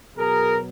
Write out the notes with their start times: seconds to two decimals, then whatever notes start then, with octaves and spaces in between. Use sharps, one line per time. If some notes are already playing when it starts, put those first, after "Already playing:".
0.17 B2 F#3 G#4 A#4